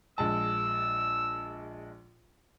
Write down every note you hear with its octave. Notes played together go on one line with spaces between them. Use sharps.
A#1 G#3 A5 E6